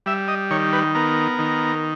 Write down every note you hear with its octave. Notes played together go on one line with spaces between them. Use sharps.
G3 E5
D#5
D#3 C#5
B4
B3 A#4
D#3